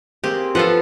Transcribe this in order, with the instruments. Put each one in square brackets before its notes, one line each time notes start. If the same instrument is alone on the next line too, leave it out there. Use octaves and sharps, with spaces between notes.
[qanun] A#3 C4 G#4 [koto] G4
[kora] F3 [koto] F4 A4 F#5 [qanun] B4 C5 G5